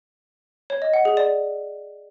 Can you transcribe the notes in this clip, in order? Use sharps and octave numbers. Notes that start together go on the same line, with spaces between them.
C#5
D#5
F#5
G#4
D5